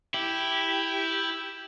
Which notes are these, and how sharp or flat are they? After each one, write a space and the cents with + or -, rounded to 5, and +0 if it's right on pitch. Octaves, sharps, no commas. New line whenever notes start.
E4 +0 G4 +0